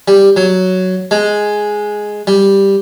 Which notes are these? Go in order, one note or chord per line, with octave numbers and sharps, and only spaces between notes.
G3
F#3
G#3
G3